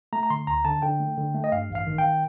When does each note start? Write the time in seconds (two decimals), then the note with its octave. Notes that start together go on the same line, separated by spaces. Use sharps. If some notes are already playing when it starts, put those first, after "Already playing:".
0.13 A3 A#5
0.23 A#5
0.30 D3 C6
0.47 D2 A#5
0.65 D3 A5
0.82 D3 G5
1.00 A3
1.17 D3
1.34 A3
1.44 D#5
1.52 G2 F5
1.70 A1
1.75 F5
1.87 D#3
1.98 G5